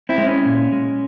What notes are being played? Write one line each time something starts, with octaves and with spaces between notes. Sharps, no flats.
C4 E4
G#3
C#4
A#2
G#3